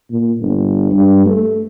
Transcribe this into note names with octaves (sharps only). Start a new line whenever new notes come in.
A#2
G1
G2
A3